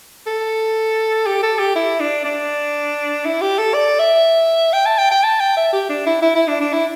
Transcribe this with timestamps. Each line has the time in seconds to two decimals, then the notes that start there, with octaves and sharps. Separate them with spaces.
0.27 A4
1.26 G4
1.43 A4
1.59 G4
1.76 E4
2.00 D4
2.25 D4
3.25 E4
3.41 G4
3.58 A4
3.74 D5
3.99 E5
4.73 G5
4.86 A5
4.98 G5
5.11 G5
5.23 A5
5.40 G5
5.57 E5
5.73 G4
5.89 D4
6.06 E4
6.22 E4
6.35 E4
6.48 D4
6.60 D4
6.73 E4